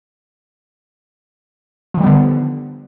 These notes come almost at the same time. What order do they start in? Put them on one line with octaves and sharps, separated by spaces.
F3 D#3 G3 B3 D3